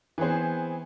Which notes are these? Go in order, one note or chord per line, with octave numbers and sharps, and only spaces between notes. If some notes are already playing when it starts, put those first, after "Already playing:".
E3 B3 C4 G#4 C5